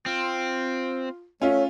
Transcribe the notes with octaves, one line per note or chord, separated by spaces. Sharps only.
C4 F4
A3 C#4 F4 C#5